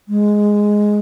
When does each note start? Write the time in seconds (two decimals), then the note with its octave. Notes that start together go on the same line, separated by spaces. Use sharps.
0.09 G#3